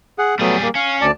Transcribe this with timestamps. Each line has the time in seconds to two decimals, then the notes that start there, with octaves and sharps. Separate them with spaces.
0.19 G#4 F#5
0.39 F#3 G3 A3 B3 G#4
0.62 A#3
0.75 C#4 F5
1.01 D2 D5 A5